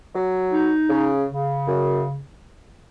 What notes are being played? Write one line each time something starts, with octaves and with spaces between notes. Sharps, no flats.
F#3
D#4
C#3
C#3
F#2